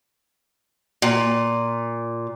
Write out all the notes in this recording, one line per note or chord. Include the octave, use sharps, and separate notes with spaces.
A#2